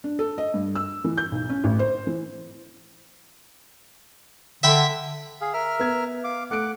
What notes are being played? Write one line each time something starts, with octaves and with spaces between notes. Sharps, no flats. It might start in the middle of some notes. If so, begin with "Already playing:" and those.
D4
A4
D#5
G2
E6
E3
G6
B1
C#4
A1
C5
E3
D3 E5 G5 B5
G#4 F5
A#4 E5 F6
B3 G#6
F5 D6
A3 F#5 D6 D7